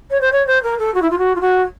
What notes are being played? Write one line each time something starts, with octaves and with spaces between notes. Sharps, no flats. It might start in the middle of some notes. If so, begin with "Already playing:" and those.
C#5
C5
C#5
C5
A#4
A4
F#4
E4
F4
F#4
F4
F#4